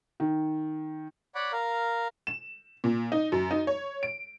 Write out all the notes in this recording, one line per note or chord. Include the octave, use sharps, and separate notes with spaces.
D#3
C#5 D5 F#5 B5 D6
A#4 F5
E7
A#2
D#4
F#2
D#4
C#5
D7